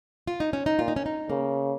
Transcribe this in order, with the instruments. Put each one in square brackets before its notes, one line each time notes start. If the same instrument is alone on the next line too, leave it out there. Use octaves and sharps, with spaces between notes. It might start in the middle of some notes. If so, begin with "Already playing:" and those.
[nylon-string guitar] F4
D#4
C#4
D#4
[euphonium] A#2 [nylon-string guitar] F4
[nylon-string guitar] D#4
C#4
D#4
[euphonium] C#3 [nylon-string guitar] A#3